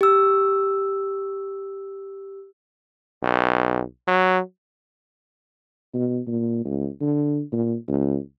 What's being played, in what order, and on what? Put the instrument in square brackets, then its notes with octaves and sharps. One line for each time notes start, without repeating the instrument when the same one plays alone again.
[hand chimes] G4 E6
[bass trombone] B1
F#3
[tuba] B2
A#2
C#2
D3
A#2
C#2